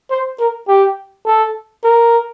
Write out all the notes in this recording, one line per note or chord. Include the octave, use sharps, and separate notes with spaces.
C5
A#4
G4
A4
A#4